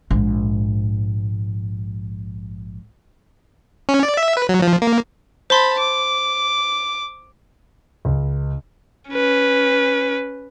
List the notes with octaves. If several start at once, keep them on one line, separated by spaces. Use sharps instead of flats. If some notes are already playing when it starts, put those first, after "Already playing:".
A#1 G#2
C#4
D5
E5
B4
F#3
F3
A#3
C5 A5 B5 C6
D6
C#2
C#4 B4